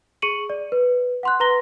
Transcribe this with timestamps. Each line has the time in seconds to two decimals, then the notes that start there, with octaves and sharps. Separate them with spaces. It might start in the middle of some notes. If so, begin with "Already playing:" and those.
0.22 G#4 C#6 C#7 D#7 F#7
0.50 D5
0.72 B4
1.23 F#5 C6 F#6
1.40 B4 A#5 C6 A#6 G7